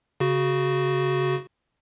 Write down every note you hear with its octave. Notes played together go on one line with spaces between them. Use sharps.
C#3 F#4